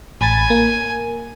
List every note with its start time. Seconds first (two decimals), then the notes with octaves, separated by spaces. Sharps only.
0.21 A1 G#5 B5 A6
0.50 A#3